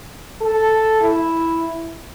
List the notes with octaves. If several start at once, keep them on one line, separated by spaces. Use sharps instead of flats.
A4
E4